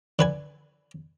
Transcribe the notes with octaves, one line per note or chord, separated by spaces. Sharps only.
D3 B4 G#5